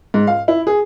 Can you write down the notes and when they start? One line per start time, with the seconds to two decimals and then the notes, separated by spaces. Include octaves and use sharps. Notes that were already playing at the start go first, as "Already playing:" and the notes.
0.14 G#2
0.27 F5
0.48 E4
0.67 G#4